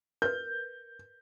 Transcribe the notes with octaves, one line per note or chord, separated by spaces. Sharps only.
A#4 B4 G6